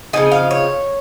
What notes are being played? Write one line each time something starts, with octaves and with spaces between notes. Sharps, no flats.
C#3 F3 C4 D#4 G#5
F5
C#5